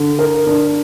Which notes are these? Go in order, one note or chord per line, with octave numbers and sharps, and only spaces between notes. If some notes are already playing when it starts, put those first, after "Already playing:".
Already playing: D3
A#4
D4